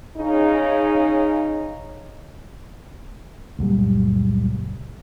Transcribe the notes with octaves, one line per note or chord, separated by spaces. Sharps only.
C#3 D#4
C#2 F#2 A#2 G3